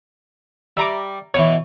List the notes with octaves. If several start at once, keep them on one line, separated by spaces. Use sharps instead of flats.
G3 E5 A#5 D6
B2 E3 C#5